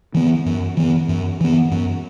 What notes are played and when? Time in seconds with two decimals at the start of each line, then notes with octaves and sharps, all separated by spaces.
0.14 E3 B3
0.46 F#2
0.77 E3 B3
1.08 F#2
1.41 E3 B3
1.71 F#2